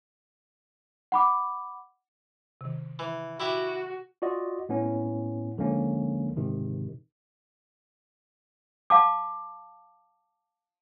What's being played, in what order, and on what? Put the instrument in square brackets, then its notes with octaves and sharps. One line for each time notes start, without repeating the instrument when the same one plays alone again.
[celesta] F#5 B5 D6
[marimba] C3 D#3
[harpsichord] E3
[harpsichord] E4 G4 E5 [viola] F#4
[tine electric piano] F4 F#4 D5 D#5
A2 B3 C#4
D2 D3 F3 G#3 A#3 C#4
G#2 C3 D#3
[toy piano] F5 A5 D6